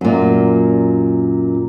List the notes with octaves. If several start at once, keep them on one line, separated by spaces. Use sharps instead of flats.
F#2 A#2